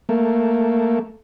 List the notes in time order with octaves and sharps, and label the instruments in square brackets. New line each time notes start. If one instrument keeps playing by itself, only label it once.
[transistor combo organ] A3 A#3